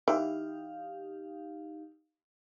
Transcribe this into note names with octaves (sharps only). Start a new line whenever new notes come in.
E3 D#4 G4 F5